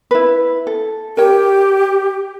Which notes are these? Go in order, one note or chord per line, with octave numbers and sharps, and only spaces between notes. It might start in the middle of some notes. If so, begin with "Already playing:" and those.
E4 B4
A4
G4 A#4 C#5 G5